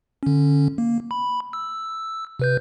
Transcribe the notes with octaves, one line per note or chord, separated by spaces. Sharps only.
D3 C#4
A#3
B5
E6
C3 B4 G6